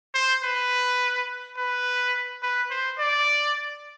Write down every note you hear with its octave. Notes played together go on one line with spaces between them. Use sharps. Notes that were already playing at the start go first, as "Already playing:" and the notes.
C5
B4
B4
B4
C5
D5